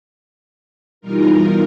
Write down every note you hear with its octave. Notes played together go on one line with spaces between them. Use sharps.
B2 E3 G3 D#4 F4 A#4